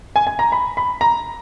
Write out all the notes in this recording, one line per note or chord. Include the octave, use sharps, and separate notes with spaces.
G#5
G#5
A#5
B5
B5
A#5